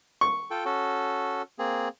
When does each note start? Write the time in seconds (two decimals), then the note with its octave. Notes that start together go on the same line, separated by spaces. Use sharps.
0.21 C#6
0.50 F4 A4 G5
0.65 C#4 F#4 A4
1.59 A#3 C4 G#4